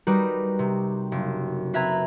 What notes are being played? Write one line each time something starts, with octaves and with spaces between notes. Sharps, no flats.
G3 D#4 F#4 A#4 B4
C3
F#1
C4 B4 E5 A#5 G#6